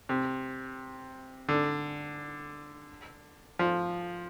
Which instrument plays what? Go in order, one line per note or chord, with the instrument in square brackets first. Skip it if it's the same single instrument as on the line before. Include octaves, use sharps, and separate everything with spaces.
[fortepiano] C3
D3
F3